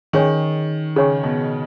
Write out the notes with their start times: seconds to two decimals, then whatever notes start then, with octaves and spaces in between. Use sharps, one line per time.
0.13 D#3 C#4 G#4 C#5 G#5 C#6
0.96 C#3 C#4 G#4 C#5 G#5 C#6
1.23 B2